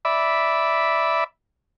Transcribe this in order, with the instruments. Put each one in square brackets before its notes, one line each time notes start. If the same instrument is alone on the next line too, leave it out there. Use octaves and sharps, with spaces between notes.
[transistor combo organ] D5 E5 B5